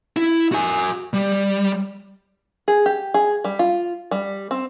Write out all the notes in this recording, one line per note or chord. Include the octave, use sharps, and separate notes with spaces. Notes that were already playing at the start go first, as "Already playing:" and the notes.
E4
F#4 G#5
G3
G#4
G4
G#4
G3
F4
G3
C4